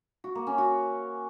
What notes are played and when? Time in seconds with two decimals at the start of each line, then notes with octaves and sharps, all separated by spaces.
0.24 F#4
0.35 A#3
0.47 C#4
0.58 F#4